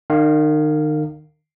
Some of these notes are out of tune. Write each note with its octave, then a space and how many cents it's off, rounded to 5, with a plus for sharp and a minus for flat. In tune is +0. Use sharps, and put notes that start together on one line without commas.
D#3 -35 F5 +0